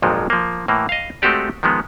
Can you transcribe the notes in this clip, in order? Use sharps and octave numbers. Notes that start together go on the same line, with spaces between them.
G#1 F2 A#2 F3 F#3 G#3
F3 A#3
A2 E3 A#3
D#5 F5
G#3 A3 C4 F#4 G4 D5
D#3 F3 G#3 B3